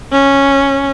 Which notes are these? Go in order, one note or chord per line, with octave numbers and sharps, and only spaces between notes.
C#4